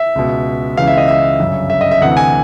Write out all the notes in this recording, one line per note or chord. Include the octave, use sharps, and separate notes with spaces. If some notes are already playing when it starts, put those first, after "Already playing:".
Already playing: E5
C#2 B2
C#2 C#3 E3 F5
E5
D#5
E5
G1 F#2 C#3
E5
D#5
E5
D2 C3 E3 F#5
G#5